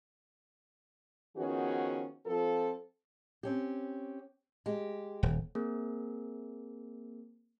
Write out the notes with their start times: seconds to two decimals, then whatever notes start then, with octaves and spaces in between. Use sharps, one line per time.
1.36 D#3 F3 B3 C#4 F#4 G#4
2.25 F3 C4 A4
3.43 C4 C#4 G4
4.66 G#3 G4
5.23 D#1
5.55 A#3 C4 G#4 A#4